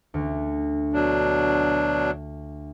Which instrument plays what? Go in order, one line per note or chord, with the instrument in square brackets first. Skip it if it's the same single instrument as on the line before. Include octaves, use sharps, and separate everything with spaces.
[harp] D2
[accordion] B2 F#3 D4